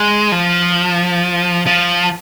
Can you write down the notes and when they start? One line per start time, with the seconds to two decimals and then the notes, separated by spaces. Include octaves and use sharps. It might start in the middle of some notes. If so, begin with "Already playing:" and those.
Already playing: G#3
0.32 F3
1.67 F3